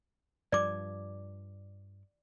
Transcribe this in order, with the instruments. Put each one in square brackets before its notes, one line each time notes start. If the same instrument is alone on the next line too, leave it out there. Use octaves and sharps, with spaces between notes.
[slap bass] G2 F3 [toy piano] D5 D6